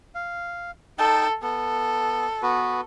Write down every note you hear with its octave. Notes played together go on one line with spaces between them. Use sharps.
F5
D#4 A4 G5 A5
B3 A4
B3 F#4 B4